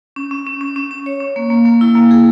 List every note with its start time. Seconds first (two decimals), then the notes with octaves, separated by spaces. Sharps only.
0.16 C#4
0.31 C#4
0.47 C#4
0.61 C#4
0.76 C#4
0.91 C#4
1.06 C#5
1.20 C#4
1.36 A#3
1.50 A#3
1.65 A#3
1.81 E4
1.95 A#3
2.11 G#4